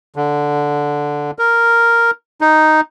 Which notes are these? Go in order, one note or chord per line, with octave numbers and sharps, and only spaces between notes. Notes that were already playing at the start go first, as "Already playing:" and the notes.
D3
A#4
D#4